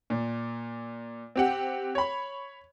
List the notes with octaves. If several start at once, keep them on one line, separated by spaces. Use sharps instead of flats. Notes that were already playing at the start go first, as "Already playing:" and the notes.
A#2
C4 G4 F#5
C#5 B5